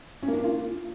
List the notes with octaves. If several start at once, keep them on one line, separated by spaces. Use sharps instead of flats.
C#4
A#3
D4
A#3
F4